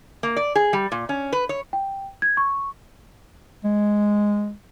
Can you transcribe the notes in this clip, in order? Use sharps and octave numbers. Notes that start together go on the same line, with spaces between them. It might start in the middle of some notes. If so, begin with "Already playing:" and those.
A#3
D5
G#4
G3
A#2
C#4
B4
C#5
G5
G#6
C#6
G#3